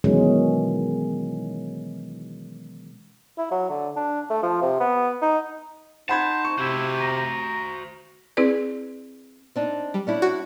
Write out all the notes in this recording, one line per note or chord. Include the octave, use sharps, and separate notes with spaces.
B2 D#3 E3 F#3 G#3 C#4
E4
F#3
D3
D4
A3
F3
C3
B3
D#4
D#4 C5 F#5 A5 B5 G#6
C#6
C3 E4 F#4 C5
A#5
C4 E4 G#4 B4 D5
C4 D4 D#4
G3
C#4 D4 E4
F#4